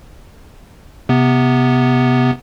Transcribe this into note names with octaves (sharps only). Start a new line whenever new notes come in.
C3 B3